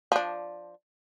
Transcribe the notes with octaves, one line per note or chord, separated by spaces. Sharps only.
F3 D4